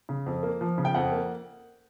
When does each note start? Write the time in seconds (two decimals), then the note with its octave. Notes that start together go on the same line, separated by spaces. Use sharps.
0.09 C#3
0.26 F2
0.43 A#3
0.61 F3
0.78 C#3
0.85 G5
0.95 F2 F#5
1.12 A#3